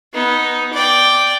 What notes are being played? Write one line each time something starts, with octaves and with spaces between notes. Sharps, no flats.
B3 D#4
D5 G5